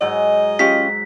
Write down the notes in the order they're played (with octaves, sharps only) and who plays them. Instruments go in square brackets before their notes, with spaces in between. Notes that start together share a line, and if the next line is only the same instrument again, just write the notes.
[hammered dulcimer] G#2 F#3 [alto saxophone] D#5
[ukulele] C#4 F4 G4 [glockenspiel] B6